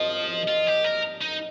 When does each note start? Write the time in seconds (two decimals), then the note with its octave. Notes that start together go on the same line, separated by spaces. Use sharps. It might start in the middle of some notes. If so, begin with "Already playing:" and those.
Already playing: F3 D#5
0.48 F4
0.67 G4
0.84 A#4
1.21 D#4